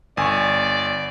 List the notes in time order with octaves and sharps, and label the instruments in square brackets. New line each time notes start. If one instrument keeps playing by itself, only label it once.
[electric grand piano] G1 [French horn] D5 [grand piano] G#5 C#6